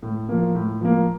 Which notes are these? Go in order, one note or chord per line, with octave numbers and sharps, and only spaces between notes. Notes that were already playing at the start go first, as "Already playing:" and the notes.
A2
F3 A#3
A2
F3 A#3